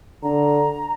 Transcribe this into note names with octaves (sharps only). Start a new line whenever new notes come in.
D3 A#5